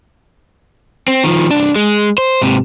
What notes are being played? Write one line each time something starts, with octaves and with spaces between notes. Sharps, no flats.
C4
D#3 F3
C2 D4
G#3
C5
G#2 C3